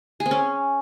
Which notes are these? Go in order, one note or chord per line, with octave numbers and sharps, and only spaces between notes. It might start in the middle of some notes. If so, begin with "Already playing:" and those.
G#4
C4
C#4